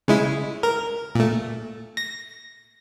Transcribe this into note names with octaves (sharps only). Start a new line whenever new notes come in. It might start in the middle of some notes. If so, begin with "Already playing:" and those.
C#3 G#3 E4
A#4
A#2 A3
A#6